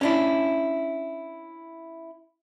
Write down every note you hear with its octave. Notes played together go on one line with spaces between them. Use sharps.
C#4 D4 E4